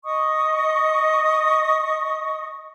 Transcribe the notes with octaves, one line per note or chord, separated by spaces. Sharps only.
D#5 C#6 D#6